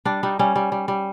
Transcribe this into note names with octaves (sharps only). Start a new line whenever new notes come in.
G3 D4
G3 D#4
G3 C#4
G3
G3
G3